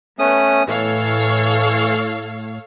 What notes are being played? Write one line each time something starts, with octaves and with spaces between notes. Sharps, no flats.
A3 B3 C#4 D#6
A2 E3 A4 C#5 F5